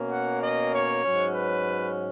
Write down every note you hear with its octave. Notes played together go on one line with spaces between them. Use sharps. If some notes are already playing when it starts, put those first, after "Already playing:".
Already playing: B2 A#3 C#4
F#5
D#5
C#5
G#2 F#3 C#4
B4